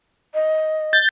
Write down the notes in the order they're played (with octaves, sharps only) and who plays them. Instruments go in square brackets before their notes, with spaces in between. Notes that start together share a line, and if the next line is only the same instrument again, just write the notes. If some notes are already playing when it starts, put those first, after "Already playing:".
[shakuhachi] D#5
[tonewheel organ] G6 A6